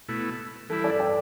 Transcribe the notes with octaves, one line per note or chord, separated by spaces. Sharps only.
B2 A3 E4
E3 G3 E4 A4
A4 D5
D5 G5